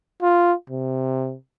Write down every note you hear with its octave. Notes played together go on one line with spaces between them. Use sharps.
F4
C3